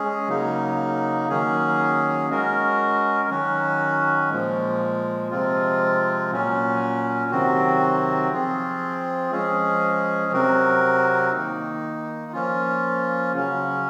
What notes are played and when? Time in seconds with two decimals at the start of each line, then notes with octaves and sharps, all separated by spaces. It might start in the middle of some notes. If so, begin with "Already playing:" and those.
Already playing: G#3 C#4 G#4
0.28 C#3 F#3 A#3 D#4
1.29 D#3 F#3 A#3 C#4 G#4
2.30 G#3 C#4 F#4 A#4
3.30 D#3 F#3 C#4 F#4
4.30 A#2 F3 G#3
5.30 C3 F3 G#3 C4 F4
6.31 A#2 F#3 C#4
7.31 C3 D#3 F#3 C4 F#4
8.31 F3 C4 F4 G#4
9.31 F3 G#3 C#4 G#4
10.32 C3 F#3 C4 F#4 A#4
11.32 D#3 A#3 D#4
12.32 F3 A#3 C#4 F4
13.33 C#3 F#3 C#4